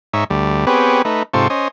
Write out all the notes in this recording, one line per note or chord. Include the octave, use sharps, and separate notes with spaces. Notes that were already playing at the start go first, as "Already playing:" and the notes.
G#2 D#4 C#5 E5
D2 G3
B3 C4 G4 G#4 B4 C#5
A3 D#4 B4
G#2 C3 F4 A4 C5 C#6
C#4 C5 D#5